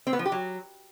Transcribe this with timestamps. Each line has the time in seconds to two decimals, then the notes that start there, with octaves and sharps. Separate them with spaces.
0.07 C4
0.13 B3
0.19 F3
0.26 G4
0.32 F#3